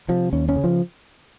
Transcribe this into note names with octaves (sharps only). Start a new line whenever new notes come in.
C3 F3
D#2 C#4
C#4
C#3
F3